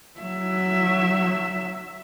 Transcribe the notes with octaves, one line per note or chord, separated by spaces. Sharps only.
F#3 E5